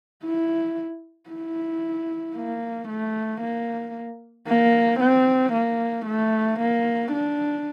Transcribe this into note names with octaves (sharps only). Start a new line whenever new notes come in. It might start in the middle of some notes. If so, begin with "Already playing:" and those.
E4
E4
A#3
A3
A#3
A#3
C4
A#3
A3
A#3
D4